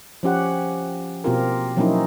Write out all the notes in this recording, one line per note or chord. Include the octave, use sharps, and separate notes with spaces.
F3 C#4 G4 F#5
B2 A#3 C4 F4 G4 A#4
F3 F#3 A#3 C#4 D#4 E4